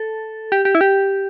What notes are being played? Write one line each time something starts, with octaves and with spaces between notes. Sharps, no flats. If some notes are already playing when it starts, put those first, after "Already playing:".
Already playing: A4
G4
G4
E4
G4